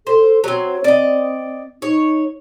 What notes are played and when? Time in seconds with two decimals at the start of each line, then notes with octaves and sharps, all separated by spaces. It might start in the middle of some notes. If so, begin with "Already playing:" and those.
0.07 A4 C5
0.44 F#3 C4 C#5
0.84 C4 D5 D#5
1.82 D#4 C#5